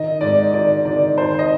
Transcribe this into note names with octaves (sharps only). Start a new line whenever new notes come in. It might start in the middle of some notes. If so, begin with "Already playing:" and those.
Already playing: D#3 D#5
G#2 D5
D#3 D5
D#3 D5
D#3 C5
D#5